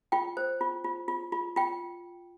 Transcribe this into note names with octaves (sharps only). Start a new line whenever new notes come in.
F4 G5
C5
F4
F4
F4
F4
F4 G5